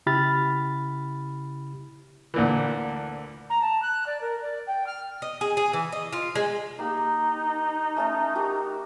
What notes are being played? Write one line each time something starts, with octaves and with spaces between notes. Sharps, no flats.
C#3 E4 G4 B5 F6 A6
D2 A#2 E3
A#5
A5
F#6
D5
A#4
D5
G5
F6
D#5
G#4
G#4
E3
D#5
F4
G#3
A#3 D#4 G4
A3 C#4 A5
F#4 G4 A#4